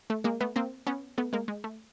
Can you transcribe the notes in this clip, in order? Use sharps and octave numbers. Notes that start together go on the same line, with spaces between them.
A3
G#3 A#3
A3 B3
A#3 C4
B3 C#4
A3 B3
G#3 A#3
G#3
A3